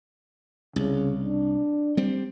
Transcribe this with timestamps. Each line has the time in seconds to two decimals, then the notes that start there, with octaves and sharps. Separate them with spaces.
0.76 C2 C#3
1.22 D4
1.97 G3 C4